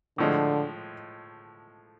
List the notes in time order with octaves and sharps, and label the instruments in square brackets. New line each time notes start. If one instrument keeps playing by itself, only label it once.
[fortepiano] A2 F3 G#3 [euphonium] D3